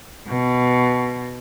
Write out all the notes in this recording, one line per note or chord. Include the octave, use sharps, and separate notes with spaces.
B2